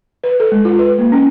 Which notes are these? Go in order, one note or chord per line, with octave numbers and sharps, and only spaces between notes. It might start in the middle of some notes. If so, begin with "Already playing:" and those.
B4
A4
G#3
F4
B4
A#3
C#4